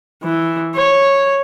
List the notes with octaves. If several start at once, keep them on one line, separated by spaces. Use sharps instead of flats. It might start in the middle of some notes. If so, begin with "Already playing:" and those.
E3
C#5